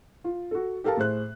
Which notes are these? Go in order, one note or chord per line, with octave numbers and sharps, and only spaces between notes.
F4
F#4 A4
G4 A4 A#4 F5 A5
A2 G#4 C5 F#6